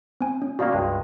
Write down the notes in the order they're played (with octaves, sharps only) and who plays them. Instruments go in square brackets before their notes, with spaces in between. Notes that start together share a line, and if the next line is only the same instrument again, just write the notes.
[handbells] C4 G#5
C#4
[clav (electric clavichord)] B2 D#3 A#3 [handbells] F#4 D5 F5
[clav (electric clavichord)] C#2 G2 G#3